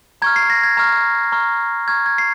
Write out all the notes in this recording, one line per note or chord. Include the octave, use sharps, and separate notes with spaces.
A#5 C#6 F6 G#6
C7
A#6
G#6
A#5 C#6 F6
A#5 C#6 F6
A#5 C#6 F6 G#6
G#6
C7